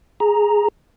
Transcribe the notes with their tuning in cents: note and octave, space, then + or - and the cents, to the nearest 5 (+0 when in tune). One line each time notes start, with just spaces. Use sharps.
G#4 +0 A#5 +0